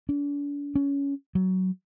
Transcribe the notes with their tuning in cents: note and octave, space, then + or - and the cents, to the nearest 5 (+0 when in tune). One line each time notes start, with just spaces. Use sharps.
D4 -40
C#4 +15
F#3 +15